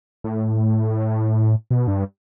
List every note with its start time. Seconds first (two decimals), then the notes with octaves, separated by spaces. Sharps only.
0.24 A2
1.71 B2
1.88 G2